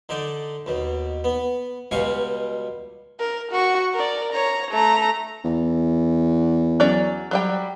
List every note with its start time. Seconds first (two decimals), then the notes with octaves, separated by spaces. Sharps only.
0.09 D3 D#4 D5
0.66 D#2 B2
1.24 B3
1.91 C#2 B2 G3 F5 G#5 C#6
3.19 A#4
3.52 F#4 C#6
3.94 A#4 D5
4.32 C#5 A#5
4.71 A3 A#5
5.45 E2
6.80 F#3 C#4 D5
7.31 F#3 G3 G5